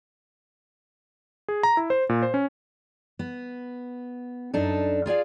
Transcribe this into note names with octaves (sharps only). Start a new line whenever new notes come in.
G#4
A#5
E4
C5
A#2
C5
C#4
B3
F#2 D4 D#4 A4
F4 G#4 D5 F5